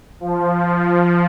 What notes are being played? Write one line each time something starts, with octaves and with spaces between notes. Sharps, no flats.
F3
F3